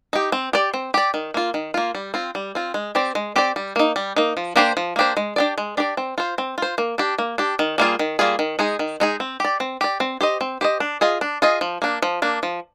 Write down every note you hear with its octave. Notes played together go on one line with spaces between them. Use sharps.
D#4 G4
C4
G4 D5
C4
G4 D5
D#3
A#3 F4
D#3
A#3 F4
G3
C4 F4
G3
C4 F4
G#3
C4 G4 D5
G#3
C4 G4 D5
G3
A#3 D#4
G3
A#3 D#4
F3
A#3 D4 G4 C5
F3
A#3 D4 G4 C5
G#3
D4 G4 D5
G#3
D4 G4 D5
C4
F4 C5
C4
F4 C5
A#3
D4 G4
A#3
D4 G4
D#3
G3 A#3 F4 G#4
D#3
G3 A#3 F4 G#4
D#3
G#3 D#4 G#4
D#3
G#3 D#4 G#4
C4
G4 D5
C4
G4 D5
C4
G4 C5 D#5
C4
G4 C5 D#5
D4
F4 G#4 D#5
D4
F4 G#4 D#5
F3
A#3 D4
F3
A#3 D4
F3